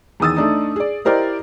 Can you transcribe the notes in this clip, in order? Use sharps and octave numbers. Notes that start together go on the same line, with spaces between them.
E2 D#3 D#6 E6 A6
A3 D4 D#4
G#4 D5
E4 G4 A#4 C5 D5 D#5